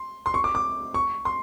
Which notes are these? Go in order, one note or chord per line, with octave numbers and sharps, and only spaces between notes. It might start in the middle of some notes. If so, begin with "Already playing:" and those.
Already playing: C6
C6
C#6
D6
D6
C#6
C6